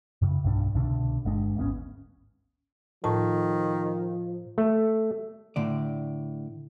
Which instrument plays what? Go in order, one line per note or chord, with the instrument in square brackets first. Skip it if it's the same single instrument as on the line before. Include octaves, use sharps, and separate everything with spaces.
[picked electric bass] F#2 C#3
B1 G2 D4
C2 B2 D3 D4
G1 G#3 D4
D1 G#1 B3 C#4
[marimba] A2 A5 [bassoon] D#3 [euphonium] F3
[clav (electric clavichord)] A3
[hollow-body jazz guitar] A2 D3 D5